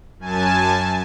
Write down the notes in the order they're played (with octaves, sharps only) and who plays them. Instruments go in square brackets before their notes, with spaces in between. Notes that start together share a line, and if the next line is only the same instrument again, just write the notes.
[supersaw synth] F#2 G#5 A5